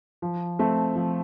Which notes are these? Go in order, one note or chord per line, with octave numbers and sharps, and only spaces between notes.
F3
A3 C4 A4
F3